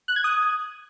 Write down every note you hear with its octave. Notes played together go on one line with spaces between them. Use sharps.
F#6
G#6
D#6